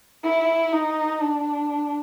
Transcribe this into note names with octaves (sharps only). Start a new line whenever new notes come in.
E4
D#4
D4